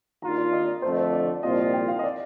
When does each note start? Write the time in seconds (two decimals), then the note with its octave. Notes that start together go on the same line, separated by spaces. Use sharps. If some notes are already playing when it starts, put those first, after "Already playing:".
0.22 D#2 D#3 A#3 D4 F4 A#5
0.38 D5
0.53 D#5
0.68 D5
0.82 F2 D3 A3 C5
0.98 C5
1.13 D5
1.43 C2 A#2 F3 C4 F4 D#5
1.58 D#5
1.73 G5
1.88 F5
1.99 D#5
2.04 D5